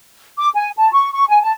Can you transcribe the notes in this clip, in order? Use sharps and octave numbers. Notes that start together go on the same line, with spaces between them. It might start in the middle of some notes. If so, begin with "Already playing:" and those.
D6
G#5
A5
C#6
C#6
G#5
A5